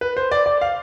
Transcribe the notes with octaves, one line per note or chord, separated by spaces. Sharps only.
B4
C5
D5
D5
F5